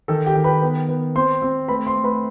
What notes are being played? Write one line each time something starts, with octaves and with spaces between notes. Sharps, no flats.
D#3 A4
G4 G5
D#3
B4 B5
B3
B3
C4 C5 C6
C4
A3 B4 B5
C5 C6
A3
B4 B5